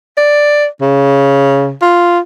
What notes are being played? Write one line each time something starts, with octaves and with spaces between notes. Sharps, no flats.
D5
C#3
F4